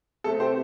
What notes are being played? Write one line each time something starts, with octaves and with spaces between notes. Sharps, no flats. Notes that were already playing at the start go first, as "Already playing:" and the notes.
C3 A3 C4 A4
G4 C5